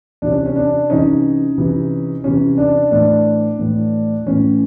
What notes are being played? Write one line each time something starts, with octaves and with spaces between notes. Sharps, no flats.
C3 E3 D4
C#4
C#4
D4
C3 E3 C#4 D#4
C3 E3
C3 E3 C#4
D4
A2 E3 D4
A2 E3
A2 E3 C#4